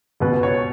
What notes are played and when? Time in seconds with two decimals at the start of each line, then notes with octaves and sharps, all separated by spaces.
0.20 C#2 B2 B3 B4
0.43 C#5